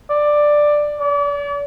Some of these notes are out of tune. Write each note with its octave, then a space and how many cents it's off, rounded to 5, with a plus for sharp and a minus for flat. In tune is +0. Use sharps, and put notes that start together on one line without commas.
D5 +10
D5 -40